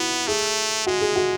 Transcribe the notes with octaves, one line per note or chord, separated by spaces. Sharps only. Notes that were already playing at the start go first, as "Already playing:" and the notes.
Already playing: B3 E4 F#4
A3 G#4
G#3 F#4
G#4
F#4